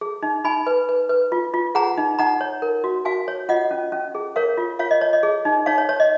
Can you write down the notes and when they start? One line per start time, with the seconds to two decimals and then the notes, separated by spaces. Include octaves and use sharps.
0.01 G#4
0.23 D#4
0.44 D#4 G#5 B5
0.67 B4
0.89 B4
1.09 B4
1.32 F4
1.54 F4
1.75 G#4 F#5 A#5
1.97 D#4
2.19 D#4 F#5 A#5
2.41 C#5
2.62 A#4
2.84 F#4
3.05 F#4 F5 G#5
3.28 C#5
3.49 F4 D#5 F#5
3.71 C#4
3.92 C#4
4.15 G#4
4.36 A#4 C#5 F5
4.57 F4
4.79 F4 C#5 F5
4.91 D#5
5.01 C#5
5.13 D#5
5.23 G#4
5.45 D#4
5.66 D#4 C#5 F5
5.78 C#5
5.89 C#5
6.00 D#5